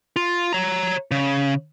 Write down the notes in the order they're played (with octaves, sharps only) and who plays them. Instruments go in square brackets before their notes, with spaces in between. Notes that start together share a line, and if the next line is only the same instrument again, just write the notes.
[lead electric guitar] F4
C#5 A#5
C#3